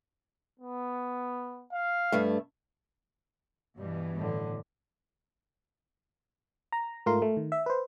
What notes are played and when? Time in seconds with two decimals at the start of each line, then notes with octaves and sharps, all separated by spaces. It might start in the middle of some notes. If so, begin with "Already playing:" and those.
0.60 B3
1.73 F5
2.12 G2 A3
3.78 G2 B2 E3 G3
4.16 A2 D3
6.72 A#5
7.06 G#2 A3 F4 A#4 C6
7.22 A3
7.37 D#3
7.52 E5
7.66 B4 C5